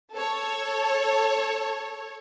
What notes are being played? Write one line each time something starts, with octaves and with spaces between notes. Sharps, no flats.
A4 C#5